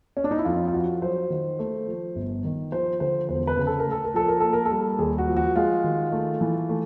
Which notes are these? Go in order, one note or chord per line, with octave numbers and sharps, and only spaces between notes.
C#4
D4
D#4
E4
F2 F4
F4
F3 F#4
F#3 C5
D#3
A3
F3
G1
D#3
F3 C5
D3 C5
E1 C5
B4
C#3
A4
A#4
A3
A4
A#4
F3 A4
A#4
A#3 A4
A#4
A4
G3
D#2 G#4
F#4
F3
F#4
G#3 F4
D#3
A3
E3
A3